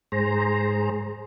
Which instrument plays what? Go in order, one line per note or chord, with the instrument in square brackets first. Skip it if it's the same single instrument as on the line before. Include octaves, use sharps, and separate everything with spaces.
[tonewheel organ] G#2 G#4 C5 A#5